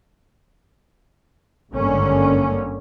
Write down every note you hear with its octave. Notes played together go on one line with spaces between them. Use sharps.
G#1 G2 D3 A#3 C#4